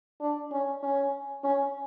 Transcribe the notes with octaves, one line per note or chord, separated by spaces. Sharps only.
D4
C#4
C#4
C#4